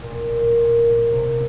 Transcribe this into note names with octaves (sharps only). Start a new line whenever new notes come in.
A#2
A#2
A#2
A#2
C3
C3